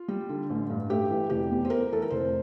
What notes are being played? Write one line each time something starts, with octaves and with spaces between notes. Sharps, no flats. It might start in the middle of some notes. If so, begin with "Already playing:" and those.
Already playing: F4
G3
D3
A1
G2
A3 G4
E3
F1 G4
E2
C5
A3 A#4
E3 A4
A#4
F1 C5